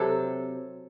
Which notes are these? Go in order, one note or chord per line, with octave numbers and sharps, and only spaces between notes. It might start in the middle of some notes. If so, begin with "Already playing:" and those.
Already playing: C3 F#3 A4